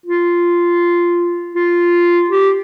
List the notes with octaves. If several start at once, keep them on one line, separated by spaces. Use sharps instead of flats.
F4
F4
G4